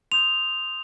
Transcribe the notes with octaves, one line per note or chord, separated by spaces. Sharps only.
C6 D#6 G6 F7